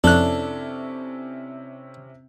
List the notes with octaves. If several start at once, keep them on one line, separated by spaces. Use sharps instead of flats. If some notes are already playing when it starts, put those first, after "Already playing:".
F2 C3 C#4 D4 E4 A4 F#6